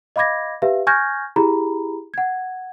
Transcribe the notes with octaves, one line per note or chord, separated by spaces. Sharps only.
D#5 F5 B5 D6 G#6 A#6
G4 B4 E5 F5
G#5 C#6 F6 G6 G#6 A#6
E4 G4 G#4 A#5 B5
F#5 G#6